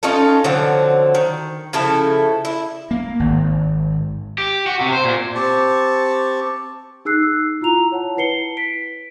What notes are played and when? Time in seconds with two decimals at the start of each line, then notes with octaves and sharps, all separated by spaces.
0.03 C#4 D#4 F4 A4
0.44 D3 F3 F#3 C4
1.15 D#3
1.73 C#3 F3 E4 A4
2.45 E4
2.91 A#3
3.20 G#1
4.38 G4
4.66 F#4
4.81 C3
4.92 C5
5.04 A#2
5.35 C4 G4 A5 C#6
7.05 D#4 G#4 E6 F#6 C7
7.23 E6
7.61 E4 F4 A#5 F7
7.92 C#5 F#5 A5
8.17 E4 B4 C7 C#7 G7
8.57 B6 D7